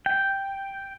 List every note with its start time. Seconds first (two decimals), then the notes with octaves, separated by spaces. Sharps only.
0.06 G5